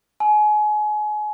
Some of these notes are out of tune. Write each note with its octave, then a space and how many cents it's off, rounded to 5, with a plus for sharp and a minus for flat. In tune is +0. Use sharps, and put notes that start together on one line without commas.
G#5 +30